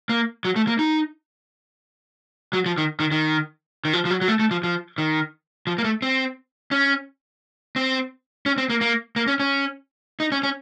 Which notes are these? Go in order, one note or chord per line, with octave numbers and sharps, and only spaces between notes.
A#3
F#3
A3
A#3
D#4
F#3
F3
D#3
D#3
D#3
D#3
F3
F3
F#3
F#3
A3
A3
F3
F3
D#3
F3
A#3
A3
C4
C#4
C4
C#4
C4
A#3
A#3
A#3
C#4
C#4
D#4
C#4
C#4